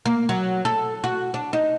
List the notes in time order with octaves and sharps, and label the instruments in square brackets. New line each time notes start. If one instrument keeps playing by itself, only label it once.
[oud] A#3
F#3
A4
F#4
D4
D#4